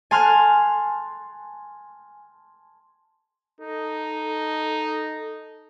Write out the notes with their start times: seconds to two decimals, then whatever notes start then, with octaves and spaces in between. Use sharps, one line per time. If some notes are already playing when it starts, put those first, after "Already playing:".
0.11 G#5 A5 C6 F6 F#6
3.61 D#4 A4